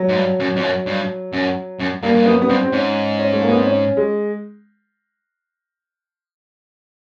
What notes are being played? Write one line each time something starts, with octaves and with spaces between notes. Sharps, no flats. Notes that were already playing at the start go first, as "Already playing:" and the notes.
Already playing: F#3
G#2
G2
F#2
F2
F#2
G2
F#2
F#2
G2 A#3
G2
F#2 B3
B3
G2 C4
C4
G#2 C#4
C#4
A3
A#3
B3
C4
C#4
G#3